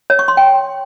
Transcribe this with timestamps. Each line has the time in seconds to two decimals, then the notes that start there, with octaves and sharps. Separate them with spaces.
0.10 C#5
0.19 C#6
0.28 C6
0.37 G5